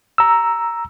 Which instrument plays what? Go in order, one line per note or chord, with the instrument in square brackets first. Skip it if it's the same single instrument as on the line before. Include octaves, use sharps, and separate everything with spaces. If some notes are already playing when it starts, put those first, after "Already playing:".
[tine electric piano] A#5 E6